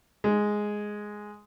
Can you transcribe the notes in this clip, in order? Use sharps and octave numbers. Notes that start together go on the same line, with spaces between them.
G#3